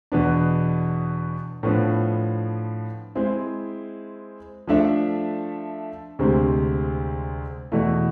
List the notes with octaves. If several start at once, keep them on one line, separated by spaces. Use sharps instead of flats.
E2 B2 B3 D4
A2 F3 B3 D4
G#3 C4 E4 G#4
F3 A3 D4 A4 E5
D2 C3 G#3 C4
E2 B2 A3 E4